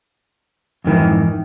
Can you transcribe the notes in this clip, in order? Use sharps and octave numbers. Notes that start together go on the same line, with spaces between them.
F2 G#2 D#3 E3